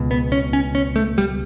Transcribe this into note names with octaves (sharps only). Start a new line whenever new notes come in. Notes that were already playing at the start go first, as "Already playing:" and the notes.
Already playing: C#2 B2
B3
C#4
C#4
C#4
A3
G3